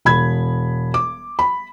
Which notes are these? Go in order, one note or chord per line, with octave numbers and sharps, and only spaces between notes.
E1 B5 G#6
D6
B5